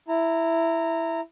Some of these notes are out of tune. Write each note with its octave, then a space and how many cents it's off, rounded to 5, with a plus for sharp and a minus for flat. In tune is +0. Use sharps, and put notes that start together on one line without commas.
E4 +0 A#5 -20